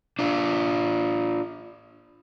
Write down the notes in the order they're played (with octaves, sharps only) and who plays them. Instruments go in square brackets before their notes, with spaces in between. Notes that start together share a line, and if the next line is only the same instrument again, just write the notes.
[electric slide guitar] D4 F4